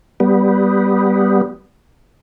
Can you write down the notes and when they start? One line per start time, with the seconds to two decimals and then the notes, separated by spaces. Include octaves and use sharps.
0.20 G3 B3